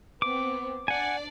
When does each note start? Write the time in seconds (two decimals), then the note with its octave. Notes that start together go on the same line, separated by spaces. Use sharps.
0.22 B3 C4 D6
0.88 D4 D5 F#5 G#5